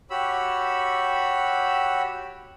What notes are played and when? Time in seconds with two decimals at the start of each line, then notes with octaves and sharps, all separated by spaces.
0.10 F#4 G4 C#5 B5 E6